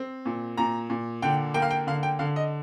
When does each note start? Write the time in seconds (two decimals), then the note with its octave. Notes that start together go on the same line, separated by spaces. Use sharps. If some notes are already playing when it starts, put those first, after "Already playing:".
Already playing: C4
0.25 A#2
0.57 A#2 A#5
0.90 A#2
1.22 D3 G5
1.54 A#3 G5
1.62 F5
1.71 G5
1.87 D3 F5
2.03 G5
2.19 D3 F5
2.36 D#5